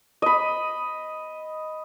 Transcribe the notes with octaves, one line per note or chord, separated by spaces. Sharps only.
D#5 B5